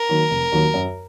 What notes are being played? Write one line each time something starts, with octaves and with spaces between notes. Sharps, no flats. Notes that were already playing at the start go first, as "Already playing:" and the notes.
Already playing: A#4
D#3 F#3 A#3
F1
D#2 D#3 F#3 A#3
F#2